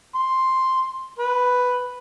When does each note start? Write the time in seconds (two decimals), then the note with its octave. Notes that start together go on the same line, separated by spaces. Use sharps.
0.15 C6
1.19 B4